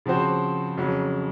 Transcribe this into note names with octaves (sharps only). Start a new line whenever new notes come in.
C#3 F3 C4 F#4 C5
F2 C#3 F#3 C#4